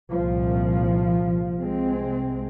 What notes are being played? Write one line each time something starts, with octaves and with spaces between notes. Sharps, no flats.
C2 A#2 F3
C2 C3 G#3 C4